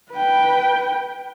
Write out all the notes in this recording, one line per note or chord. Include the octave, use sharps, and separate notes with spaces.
B4 G5